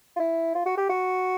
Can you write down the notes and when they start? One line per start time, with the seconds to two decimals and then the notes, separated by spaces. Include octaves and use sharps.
0.16 F4
0.20 E4
0.55 F4
0.66 F#4
0.78 G4
0.90 F#4